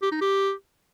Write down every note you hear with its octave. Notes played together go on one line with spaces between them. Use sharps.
G4
D#4
G4